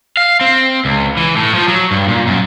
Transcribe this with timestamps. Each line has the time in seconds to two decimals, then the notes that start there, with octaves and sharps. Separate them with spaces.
0.17 F5
0.41 C4
0.85 C#2
1.17 E3
1.36 A2
1.55 F3
1.68 F#3
1.91 G2
2.08 A#2
2.27 F#2